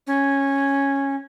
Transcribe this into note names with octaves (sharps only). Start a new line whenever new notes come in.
C#4